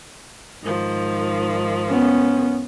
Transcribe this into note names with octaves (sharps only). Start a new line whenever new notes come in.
G#2 D#3 F3
B3 C#4